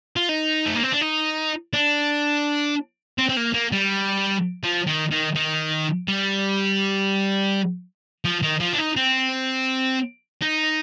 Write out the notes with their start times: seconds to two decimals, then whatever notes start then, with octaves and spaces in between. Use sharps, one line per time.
0.16 F4
0.29 D#4
0.66 A3
0.75 A#3
0.83 C4
0.92 D4
1.01 D#4
1.73 D4
3.18 C4
3.29 C4
3.37 A#3
3.54 A#3
3.72 G3
4.63 F3
4.87 D#3
5.11 D#3
5.36 D#3
6.08 G3
8.25 F3
8.43 D#3
8.60 F3
8.73 D4
8.78 D#4
8.97 C4
10.41 D#4